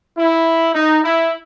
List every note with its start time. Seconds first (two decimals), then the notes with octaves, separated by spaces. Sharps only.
0.17 E4
0.74 D#4
1.04 E4